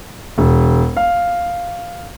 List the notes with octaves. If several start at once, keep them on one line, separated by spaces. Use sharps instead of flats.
E1
F5